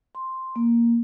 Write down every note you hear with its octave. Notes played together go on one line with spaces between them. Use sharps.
C6
A#3